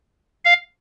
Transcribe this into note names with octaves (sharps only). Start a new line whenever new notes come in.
F5